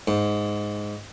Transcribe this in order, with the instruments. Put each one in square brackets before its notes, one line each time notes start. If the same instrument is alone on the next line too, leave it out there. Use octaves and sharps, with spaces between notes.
[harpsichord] G#2